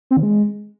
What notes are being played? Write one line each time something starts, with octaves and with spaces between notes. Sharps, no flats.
C4
D#3
G#3